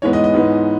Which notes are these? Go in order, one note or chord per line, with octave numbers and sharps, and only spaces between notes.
G#2 E3 G#3 B3 C#5
D#5
D#5
G#2 E3 G#3 B3